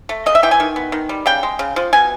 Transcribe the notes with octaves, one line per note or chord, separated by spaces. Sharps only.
A3
C#3 D#5
E5
E3 G5
G#5
D#3
B3
D#3
G3
C#3 G5
G#3
C#3
F3
B2 G#5